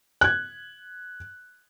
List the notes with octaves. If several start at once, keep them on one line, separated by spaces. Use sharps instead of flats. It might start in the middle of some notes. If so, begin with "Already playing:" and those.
F#6 G#6